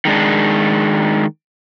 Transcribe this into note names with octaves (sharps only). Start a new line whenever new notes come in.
D#3 G#3 D4